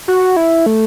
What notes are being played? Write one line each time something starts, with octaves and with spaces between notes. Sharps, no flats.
F#4
E4
A3